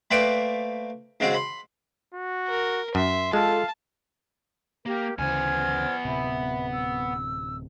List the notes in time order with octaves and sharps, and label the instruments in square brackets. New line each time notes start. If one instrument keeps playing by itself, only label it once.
[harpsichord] A3 A#3 B4 C5 D5 G5
G#2 C#3 G#3 C4 F#4
B5 C6
[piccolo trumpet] F#4
[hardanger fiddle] A#4
[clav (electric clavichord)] F#2 [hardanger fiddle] E5 [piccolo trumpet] C6
[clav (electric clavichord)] G#3 [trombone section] F4 A4 [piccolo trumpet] F5 [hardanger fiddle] A5
[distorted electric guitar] A#3 [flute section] G4 A#4
[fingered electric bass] D2 C#3 E3 [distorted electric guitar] B3 G#5 [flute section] C5 F6 G#6
[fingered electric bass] D1 C3 [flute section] E5 B5
[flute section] E6